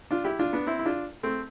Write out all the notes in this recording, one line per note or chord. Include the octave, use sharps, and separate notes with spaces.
D4 F4
E4 G4
D4 F4
B3 D4
C4 E4
E4
D4 F4
A3 C4